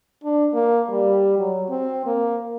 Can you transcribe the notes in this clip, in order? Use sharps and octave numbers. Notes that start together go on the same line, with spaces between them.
D4
A#3
G3
F#3
C4
A#3